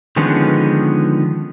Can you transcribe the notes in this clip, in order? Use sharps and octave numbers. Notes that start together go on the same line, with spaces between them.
D3 D#3 F3 G#3 B3 C#4